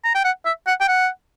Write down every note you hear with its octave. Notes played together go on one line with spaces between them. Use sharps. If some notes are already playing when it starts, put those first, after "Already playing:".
A#5
G5
F#5
E5
F#5
G5
F#5